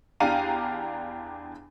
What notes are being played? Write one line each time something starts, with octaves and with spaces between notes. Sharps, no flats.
E2 D4 G4 F5 A#5 D#7